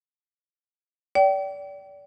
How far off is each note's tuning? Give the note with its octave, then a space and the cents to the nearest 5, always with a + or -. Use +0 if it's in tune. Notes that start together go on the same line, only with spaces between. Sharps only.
D5 -30 G5 -30